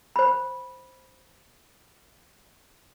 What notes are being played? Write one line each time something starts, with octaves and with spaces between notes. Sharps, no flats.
C5 B5